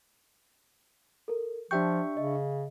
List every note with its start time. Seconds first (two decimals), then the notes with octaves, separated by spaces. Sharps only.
1.28 A4 A#4
1.71 F3 D4 G4 E5 G5 C#6 G6
2.17 C#3 D#5